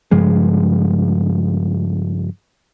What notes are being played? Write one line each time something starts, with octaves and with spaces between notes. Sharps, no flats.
G2 C#3 F3 G#3